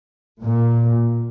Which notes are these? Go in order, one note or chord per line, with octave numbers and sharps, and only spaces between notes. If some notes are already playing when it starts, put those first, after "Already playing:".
A#2